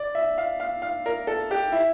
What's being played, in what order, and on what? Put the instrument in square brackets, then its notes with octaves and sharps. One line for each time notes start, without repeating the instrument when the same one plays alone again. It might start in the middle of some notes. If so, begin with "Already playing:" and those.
Already playing: [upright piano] D5
E5
F5
F5
F5
A#4
A4
G4
E4